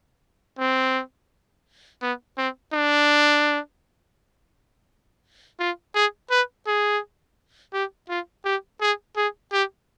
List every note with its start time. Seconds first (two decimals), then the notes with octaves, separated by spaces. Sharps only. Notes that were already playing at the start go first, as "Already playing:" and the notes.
0.59 C4
2.02 B3
2.38 C4
2.74 D4
5.60 F4
5.95 G#4
6.31 B4
6.67 G#4
7.74 G4
8.09 F4
8.45 G4
8.81 G#4
9.17 G#4
9.53 G4